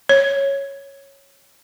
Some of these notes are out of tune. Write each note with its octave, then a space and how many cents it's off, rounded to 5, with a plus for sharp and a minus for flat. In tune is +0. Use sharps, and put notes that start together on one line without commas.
C#5 -5